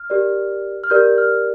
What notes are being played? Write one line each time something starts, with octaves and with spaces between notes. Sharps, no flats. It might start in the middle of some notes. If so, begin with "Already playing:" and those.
Already playing: F6
G4 A#4 D5
F6
G4 A#4 D5 G6
F6